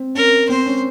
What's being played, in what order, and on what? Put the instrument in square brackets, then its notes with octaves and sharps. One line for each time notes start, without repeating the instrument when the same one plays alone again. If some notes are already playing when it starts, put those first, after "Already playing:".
Already playing: [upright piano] C4
[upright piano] C#4 [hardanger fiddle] A#4
[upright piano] C4 [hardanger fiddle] C5
[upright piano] C#4